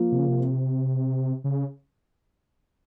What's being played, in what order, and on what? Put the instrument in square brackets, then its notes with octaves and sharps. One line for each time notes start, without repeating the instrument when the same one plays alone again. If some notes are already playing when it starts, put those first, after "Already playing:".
Already playing: [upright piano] F3 A#3
[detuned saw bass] C3
C#3
C3
C#3